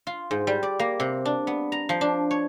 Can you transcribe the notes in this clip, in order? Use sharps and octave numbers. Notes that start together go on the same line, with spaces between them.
F4
G#2
G3
D5
A#3
C3
D4
B3
A#5
F3
D4
C#5